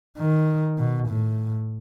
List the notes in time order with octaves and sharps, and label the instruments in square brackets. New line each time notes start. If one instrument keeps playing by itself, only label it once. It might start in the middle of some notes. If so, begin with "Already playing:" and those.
[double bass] D#3
B2
A2